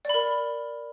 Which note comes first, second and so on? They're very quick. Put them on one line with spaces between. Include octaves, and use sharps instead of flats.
D5 B5 A#4